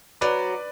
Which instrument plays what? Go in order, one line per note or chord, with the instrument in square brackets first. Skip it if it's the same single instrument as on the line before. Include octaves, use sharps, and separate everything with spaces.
[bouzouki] F#3 [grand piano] B4 D5